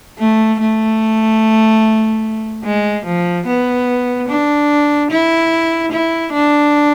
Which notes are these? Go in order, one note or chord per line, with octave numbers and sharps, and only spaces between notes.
A3
A3
G#3
F3
B3
D4
E4
E4
D4